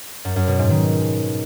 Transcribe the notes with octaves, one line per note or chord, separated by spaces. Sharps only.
F#2
F#2
B2
G#2
D#3